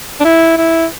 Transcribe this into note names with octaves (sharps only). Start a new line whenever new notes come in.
D4
E4
E4